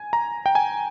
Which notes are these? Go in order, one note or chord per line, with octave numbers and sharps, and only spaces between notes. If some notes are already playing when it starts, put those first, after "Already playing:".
Already playing: G#5
A#5
G5
G#5